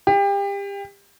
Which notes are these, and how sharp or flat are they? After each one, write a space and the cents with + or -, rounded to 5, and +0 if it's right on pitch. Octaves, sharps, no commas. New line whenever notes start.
G4 +30